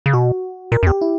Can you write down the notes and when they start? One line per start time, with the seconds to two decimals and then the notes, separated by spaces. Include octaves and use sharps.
0.06 C#3
0.13 B2 F#4
0.72 A#2 A#4
0.83 F#2
0.87 E2 G4
1.01 E4